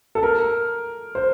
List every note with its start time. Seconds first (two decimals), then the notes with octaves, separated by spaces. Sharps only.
0.15 A4
0.23 A#4
1.15 C5